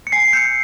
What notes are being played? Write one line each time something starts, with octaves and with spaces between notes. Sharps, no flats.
C#7
G#5 C7
E6 G6 C#7